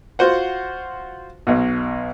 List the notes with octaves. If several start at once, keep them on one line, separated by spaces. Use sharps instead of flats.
F4 F#4 C5 F#5
B1 B2